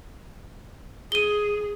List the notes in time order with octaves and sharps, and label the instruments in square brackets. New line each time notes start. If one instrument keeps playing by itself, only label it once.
[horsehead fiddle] G#4 [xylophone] D#7 G7